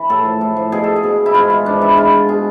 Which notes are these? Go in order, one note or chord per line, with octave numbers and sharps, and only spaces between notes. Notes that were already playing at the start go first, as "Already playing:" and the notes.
Already playing: E3
A2 A4
F3
A2
F3
B2 G#4
A4
G#4
B2
E4
G#2 F4
E3 F4
G#2 D4
E3 E4
B2 F4
B2 G#4